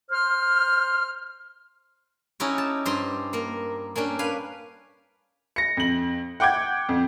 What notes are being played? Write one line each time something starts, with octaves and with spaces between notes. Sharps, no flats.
C5 C6 F6
C#4 D#4 E4 F#4 G4
A5
G2 G4 C5 A#5 C6
A#3 A#4
A#3 C#4 D4 G4
B4 F5 G#5
A#6 C#7
F2 F#7
F#5 G5 D6 G6 G#6
F2